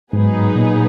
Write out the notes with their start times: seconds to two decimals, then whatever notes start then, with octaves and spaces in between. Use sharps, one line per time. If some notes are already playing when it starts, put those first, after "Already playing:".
0.13 G#2 F#3 B3 D#4 G#4 B4
0.56 A#2